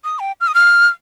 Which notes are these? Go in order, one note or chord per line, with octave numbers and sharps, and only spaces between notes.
D#6
G5
F6
D#6
F6